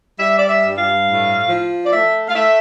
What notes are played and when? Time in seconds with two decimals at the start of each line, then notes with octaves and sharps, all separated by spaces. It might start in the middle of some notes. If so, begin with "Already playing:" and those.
0.19 G3 E5
0.37 D5
0.48 E5
0.63 G2
0.78 F5
1.06 A2
1.49 F3
1.85 D5
1.91 A3 E5
2.29 F5
2.35 A3 E5